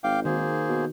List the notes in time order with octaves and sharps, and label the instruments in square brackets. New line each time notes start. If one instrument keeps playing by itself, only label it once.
[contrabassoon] G#1 [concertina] F5 G5 D6
[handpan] D#3 F#4 [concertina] A#3 G#4 C5
[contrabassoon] B2